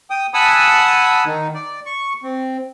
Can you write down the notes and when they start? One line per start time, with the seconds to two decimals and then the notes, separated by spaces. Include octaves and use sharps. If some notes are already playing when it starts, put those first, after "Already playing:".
0.10 G5 D#6
0.34 F#5 G#5 A5 B5 D#6 E6
1.26 D#3 D#4
1.54 D5
1.86 C#6
2.23 C4